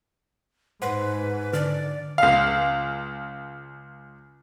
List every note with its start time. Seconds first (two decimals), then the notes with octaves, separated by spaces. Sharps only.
0.82 G#2 B4 C5 F#5 C6
1.53 D3 D4 D5 F6
2.18 C#2 F5